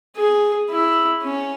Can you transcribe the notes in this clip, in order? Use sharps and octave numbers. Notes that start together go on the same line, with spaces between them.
G#4
E4
C#4